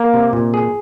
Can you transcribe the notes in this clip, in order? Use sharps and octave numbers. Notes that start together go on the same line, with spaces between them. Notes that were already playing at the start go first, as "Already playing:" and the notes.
Already playing: A#3
C3
A#2
G#4